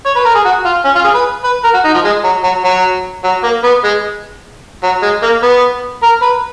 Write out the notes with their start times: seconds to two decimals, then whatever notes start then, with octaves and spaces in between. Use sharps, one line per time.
0.06 C#5
0.16 B4
0.25 A#4
0.35 G#4
0.45 F#4
0.65 F4
0.85 C#4
0.95 F4
1.04 G#4
1.15 B4
1.44 B4
1.64 A#4
1.74 F#4
1.84 D#4
1.94 F3
2.04 G#3
2.24 F#3
2.44 F#3
2.65 F#3
3.24 F#3
3.44 A#3
3.64 B3
3.84 G#3
4.84 F#3
5.03 G#3
5.23 A#3
5.43 B3
6.03 A#4
6.22 B4